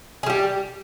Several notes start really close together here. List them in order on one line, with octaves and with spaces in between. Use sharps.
G#4 G3 G4